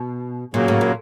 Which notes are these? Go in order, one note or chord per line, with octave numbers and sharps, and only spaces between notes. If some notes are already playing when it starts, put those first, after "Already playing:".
Already playing: B2
A#2 C#3 F#3 A#3
A2
A#2